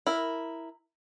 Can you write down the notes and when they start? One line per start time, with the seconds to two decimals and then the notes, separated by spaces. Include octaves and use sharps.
0.07 E4 A#4